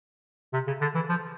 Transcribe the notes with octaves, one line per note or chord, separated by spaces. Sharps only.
C3
C#3
D3
E3
F3